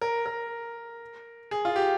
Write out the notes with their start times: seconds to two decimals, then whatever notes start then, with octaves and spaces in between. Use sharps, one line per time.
0.01 A#4
0.26 A#4
1.51 G#4
1.65 F4
1.76 G4